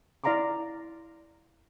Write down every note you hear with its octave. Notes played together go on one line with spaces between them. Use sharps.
E4 D5 F5 A#5 C6 D6